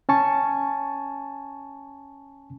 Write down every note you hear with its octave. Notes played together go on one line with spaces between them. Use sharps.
C#4 G#5 A5 C#6